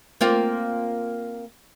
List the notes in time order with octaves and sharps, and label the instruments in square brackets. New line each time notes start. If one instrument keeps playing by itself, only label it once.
[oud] A#3 C4 F4